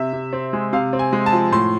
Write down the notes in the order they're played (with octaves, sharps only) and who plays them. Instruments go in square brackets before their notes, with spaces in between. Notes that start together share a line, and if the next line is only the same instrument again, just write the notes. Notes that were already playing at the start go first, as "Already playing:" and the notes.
Already playing: [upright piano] C3 E5
C3
C4
G#3
C3 F5
C4
G#5
G#3
A5
F3
A2 C6